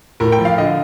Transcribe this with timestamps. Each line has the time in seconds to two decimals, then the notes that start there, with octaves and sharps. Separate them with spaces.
0.20 A2 A#4
0.32 G5
0.39 F3
0.45 F5
0.58 D3 D#5